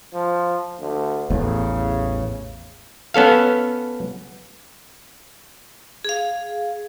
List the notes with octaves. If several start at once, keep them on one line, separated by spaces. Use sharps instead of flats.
F3
D2
A1 E2 A2 C#3
B3 C#4 A4 F5
G#4 F5